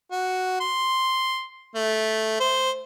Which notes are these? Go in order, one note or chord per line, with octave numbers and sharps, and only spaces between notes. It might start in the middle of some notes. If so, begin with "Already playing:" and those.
F#4
C6
A3
C5